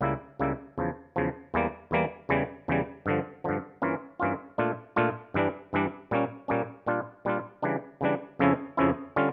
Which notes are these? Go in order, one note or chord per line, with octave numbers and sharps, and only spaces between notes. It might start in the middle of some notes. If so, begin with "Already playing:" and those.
C#2 C#3 G3 A#3 E4
C#2 C#3 G3 A#3 E4
E2 C#3 F3
E2 C#3 F3
E2 E3 G3 A#3
E2 E3 G3 A#3
E2 C#3 E3 G3
E2 C#3 E3 G3
G2 D3 F3
G2 D3 F3
G2 E3 A#3 C#4 F4
G2 E3 A#3 C#4 F4
A#2 A3 D4 F4
A#2 A3 D4 F4
G2 E3 G3 D4
G2 E3 G3 D4
A#2 G3 A#3 C#4
A#2 G3 A#3 C#4
A#2 G3 D4 F4
A#2 G3 D4 F4
C#3 E3 G3 D4
C#3 E3 G3 D4
F2 C#3 F3 C#4 E4
F2 C#3 F3 C#4 E4
D3 G3 C#4 F4